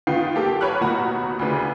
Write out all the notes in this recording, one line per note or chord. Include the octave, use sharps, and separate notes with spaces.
D#3 B3 F4 G5 C7
A#3 G4 A4 G5
A#4 B4 C#5 B5 F6 F#6
D#2 B2 F#4 F#5 A#5 B5
D2 C#3 D4 B4